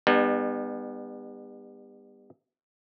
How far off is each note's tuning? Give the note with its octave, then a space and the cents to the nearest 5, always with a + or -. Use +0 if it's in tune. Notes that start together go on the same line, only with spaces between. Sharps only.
G3 +35 B3 +0 D#4 -40